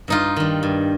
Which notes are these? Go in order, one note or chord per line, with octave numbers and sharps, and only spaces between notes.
G2 D#4 F4
D#3 G3
G2